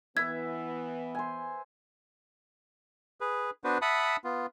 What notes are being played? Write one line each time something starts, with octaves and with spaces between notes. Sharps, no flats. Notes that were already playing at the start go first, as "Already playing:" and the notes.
E3 B3 B4 E5 G#6
C5 G#5
G#4 B4
B3 D4 F#4 B4 C5
E5 F#5 A5 B5 D#6
B3 F4